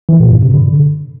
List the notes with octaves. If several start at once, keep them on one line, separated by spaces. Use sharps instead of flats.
E3
A#2
G2
C3
D3